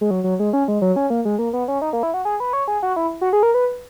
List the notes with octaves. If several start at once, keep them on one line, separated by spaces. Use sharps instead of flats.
G#3
F#3
F#3
G#3
C#4
G#3
F#3
C#4
A#3
G#3
A#3
B3
C#4
D#4
A#3
E4
F#4
G#4
B4
C#5
G#4
F#4
E4
F#4
G#4
A#4
B4